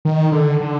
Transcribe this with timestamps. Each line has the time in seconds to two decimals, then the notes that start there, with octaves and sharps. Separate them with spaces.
0.05 D#3
0.32 D3
0.61 D3